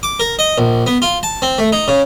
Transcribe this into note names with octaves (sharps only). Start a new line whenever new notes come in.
D6
A#4
D#5
A#1
B3
F4
A5
C4
A3
D#4
C#3